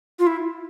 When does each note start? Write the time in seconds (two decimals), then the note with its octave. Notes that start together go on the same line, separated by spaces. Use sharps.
0.19 F4
0.27 E4